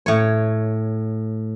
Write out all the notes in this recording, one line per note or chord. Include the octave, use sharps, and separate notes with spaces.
A2 C#5